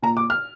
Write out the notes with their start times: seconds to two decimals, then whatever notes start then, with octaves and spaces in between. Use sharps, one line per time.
0.02 A#2 A#5
0.17 D6
0.30 F6